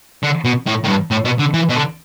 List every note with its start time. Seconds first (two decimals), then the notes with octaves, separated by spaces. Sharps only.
0.23 D3
0.45 B2
0.67 A2
0.84 A2
0.88 G2
1.11 A2
1.25 B2
1.39 D3
1.54 E3
1.69 B2
1.75 D3